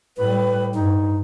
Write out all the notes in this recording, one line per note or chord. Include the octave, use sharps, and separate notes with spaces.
A2 G3 B4
G2 D#4